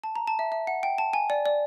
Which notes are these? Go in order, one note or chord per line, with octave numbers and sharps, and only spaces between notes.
A5
A#5
A5
E5
E5
F#5
G5
A5
G#5
D5
D5